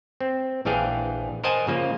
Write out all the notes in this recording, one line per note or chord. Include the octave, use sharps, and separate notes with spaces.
C4
A#1 E3 D4 G#4 F5 G5
A#4 C5 D#5 F#5 G#5 A5
C#3 F3 A#3